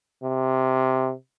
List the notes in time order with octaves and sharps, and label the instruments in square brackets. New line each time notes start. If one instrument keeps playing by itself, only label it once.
[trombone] C3